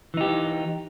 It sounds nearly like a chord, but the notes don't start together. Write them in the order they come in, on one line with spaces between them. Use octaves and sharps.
E3 D#4 G4